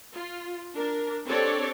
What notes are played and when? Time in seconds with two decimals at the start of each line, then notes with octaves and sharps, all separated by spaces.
0.14 F4
0.75 D4 A#4
1.26 C4 D4 G4 A4 C#5 D5